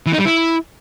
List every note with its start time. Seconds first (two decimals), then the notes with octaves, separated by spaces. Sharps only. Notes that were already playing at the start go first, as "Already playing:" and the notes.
0.06 E3
0.13 D#4
0.19 G3
0.25 E4